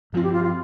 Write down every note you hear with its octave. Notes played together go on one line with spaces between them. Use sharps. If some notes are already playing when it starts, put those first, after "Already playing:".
G2 F3 C4 F4
G4
F4
F4